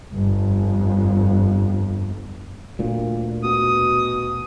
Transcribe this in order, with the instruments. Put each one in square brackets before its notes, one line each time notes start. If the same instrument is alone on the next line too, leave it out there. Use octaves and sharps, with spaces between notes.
[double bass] G1 F2
[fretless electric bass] D2 A#2
[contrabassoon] B2 [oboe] D#6